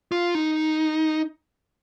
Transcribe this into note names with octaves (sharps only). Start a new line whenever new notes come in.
F4
D#4